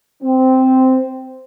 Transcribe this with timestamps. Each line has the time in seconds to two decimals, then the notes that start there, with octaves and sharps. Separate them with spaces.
0.23 C4